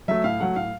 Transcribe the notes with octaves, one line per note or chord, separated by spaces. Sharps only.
F#3 A3 E5
A2 F5
F#3 A3 F#5
A2 F5